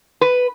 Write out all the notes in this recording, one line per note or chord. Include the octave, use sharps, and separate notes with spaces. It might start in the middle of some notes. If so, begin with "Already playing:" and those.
B4